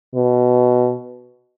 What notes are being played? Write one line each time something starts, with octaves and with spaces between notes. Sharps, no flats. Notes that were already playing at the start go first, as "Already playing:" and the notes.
B2